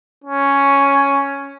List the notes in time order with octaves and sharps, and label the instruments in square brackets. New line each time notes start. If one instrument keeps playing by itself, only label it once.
[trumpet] C#4